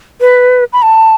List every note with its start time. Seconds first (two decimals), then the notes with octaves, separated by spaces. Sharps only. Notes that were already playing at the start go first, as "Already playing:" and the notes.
0.21 B4
0.73 B5
0.82 A5